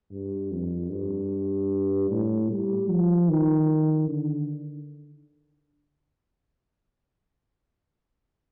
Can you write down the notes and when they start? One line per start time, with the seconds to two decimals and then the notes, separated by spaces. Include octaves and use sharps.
0.12 G2
0.51 F2
0.91 G2
2.10 A2
2.50 G3
2.89 F3
3.29 D#3
4.08 D3